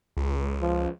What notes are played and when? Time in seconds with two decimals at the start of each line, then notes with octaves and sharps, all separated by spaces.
0.17 C#2
0.61 F3